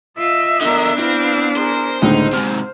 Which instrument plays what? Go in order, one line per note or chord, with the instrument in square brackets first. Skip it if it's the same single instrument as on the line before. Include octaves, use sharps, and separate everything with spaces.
[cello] F4 [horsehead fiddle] D#5 E5
[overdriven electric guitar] D3 A#4 [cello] B3 D4
[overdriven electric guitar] C4 [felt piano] E4 [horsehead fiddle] B4 F5
[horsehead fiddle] G#4 A#4 [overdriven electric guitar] C5
[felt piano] C#2 A2 D3 [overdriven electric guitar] D#4 [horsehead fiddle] C5
[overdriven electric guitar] G#2 C3 [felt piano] F6